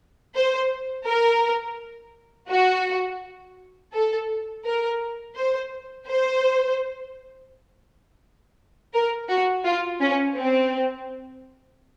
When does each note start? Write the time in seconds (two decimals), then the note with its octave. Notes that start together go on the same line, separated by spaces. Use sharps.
0.35 C5
1.07 A#4
2.50 F#4
3.93 A4
4.65 A#4
5.36 C5
6.08 C5
8.94 A#4
9.29 F#4
9.64 F4
10.00 C#4
10.36 C4